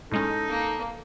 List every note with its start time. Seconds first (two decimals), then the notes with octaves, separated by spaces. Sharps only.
0.12 A2 G#3 C#4 D#4 A4
0.48 A#3